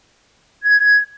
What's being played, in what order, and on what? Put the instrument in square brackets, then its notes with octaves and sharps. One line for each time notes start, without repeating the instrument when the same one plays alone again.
[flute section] G#6